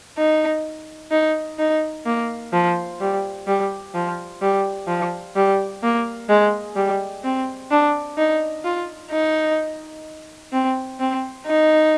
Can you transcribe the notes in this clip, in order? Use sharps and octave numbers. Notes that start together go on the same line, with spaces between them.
D#4
D#4
D#4
A#3
F3
G3
G3
F3
G3
F3
G3
A#3
G#3
G3
C4
D4
D#4
F4
D#4
C4
C4
D#4